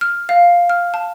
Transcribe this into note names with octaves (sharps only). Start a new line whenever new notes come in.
F6
F5
F6
A5